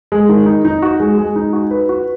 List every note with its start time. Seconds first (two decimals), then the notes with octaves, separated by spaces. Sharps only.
0.12 G#3
0.29 D#3
0.46 D#4
0.65 D#4
0.82 F#4
1.00 G#3
1.18 G#3
1.36 D#4
1.53 F#4
1.71 B4
1.89 F#4